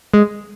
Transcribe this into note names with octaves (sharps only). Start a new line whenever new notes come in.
G#3